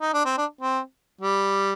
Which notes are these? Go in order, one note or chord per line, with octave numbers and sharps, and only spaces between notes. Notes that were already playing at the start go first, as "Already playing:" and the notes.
D#4
D4
C4
D4
C4
G3